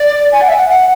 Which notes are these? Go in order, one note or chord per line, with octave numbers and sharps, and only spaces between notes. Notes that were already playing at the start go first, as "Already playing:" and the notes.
Already playing: D5
G#5
F#5
E5
F#5
F#5